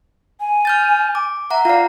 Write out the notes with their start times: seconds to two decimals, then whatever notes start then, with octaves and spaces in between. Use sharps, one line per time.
0.40 G#5
0.65 F6 G6 A6
1.15 D6
1.51 E5 F#5 A#5
1.65 F4 D5 F5